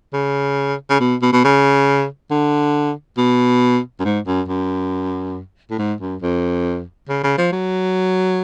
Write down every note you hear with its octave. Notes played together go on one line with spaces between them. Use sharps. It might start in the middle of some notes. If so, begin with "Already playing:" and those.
C#3
C#3
B2
B2
B2
C#3
D3
B2
F#2
G#2
F#2
F#2
A2
G#2
F#2
F2
C#3
C#3
F3
F#3